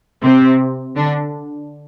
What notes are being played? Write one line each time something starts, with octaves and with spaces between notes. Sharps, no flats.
C3 C4
D3 D4